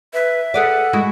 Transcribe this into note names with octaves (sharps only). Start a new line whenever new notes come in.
B4 E5
G#4 A4 B4 D5 F#5
G#3 E4 F#4